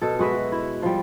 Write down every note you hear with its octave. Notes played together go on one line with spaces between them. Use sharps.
B2 A4
G#3 F#4 B4 E5
E4
F3 G3